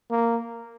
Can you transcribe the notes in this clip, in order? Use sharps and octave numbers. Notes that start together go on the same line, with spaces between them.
A#3